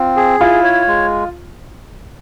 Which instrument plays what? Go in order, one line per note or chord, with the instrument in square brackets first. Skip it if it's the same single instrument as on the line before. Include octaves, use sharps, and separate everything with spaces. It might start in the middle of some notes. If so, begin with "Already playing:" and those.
Already playing: [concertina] C4 [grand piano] F4
[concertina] G#4
[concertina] E4 [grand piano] F4
[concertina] C#5
G#3